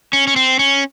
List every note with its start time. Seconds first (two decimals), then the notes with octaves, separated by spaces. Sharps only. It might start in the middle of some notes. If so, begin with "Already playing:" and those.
0.13 C#4
0.27 C#4
0.36 C4
0.59 C#4